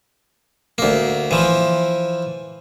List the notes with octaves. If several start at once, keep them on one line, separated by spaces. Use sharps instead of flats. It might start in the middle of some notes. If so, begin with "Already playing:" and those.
D2 A#3
E3 F3